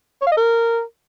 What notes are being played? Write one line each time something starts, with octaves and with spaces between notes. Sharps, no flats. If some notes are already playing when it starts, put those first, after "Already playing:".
C#5
F5
D#5
A#4